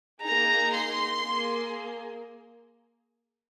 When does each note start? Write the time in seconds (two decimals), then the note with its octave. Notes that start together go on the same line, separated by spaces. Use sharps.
0.23 A#3 D#4 G#4 A#5
0.73 C6
1.23 A#3 G#4